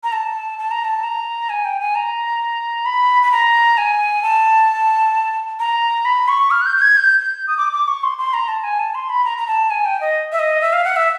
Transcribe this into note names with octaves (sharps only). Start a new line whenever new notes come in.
A#5
A5
A5
A#5
A5
A#5
G#5
G5
G#5
A#5
B5
B5
A#5
G#5
A5
A#5
B5
C#6
F6
F#6
G6
G6
G#6
G6
G6
D#6
D6
D6
C#6
C6
C6
A#5
A5
G#5
A5
C6
B5
A#5
A#5
A5
G#5
G5
D#5
E5
D#5
E5
F5
F#5
E5